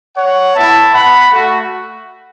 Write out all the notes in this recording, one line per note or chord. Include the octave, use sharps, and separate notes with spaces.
C#5 F#5
B3 E4 E5 A5
F#5 B5
A3 F#4